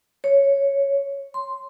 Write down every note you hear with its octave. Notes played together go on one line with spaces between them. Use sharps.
C#5
C6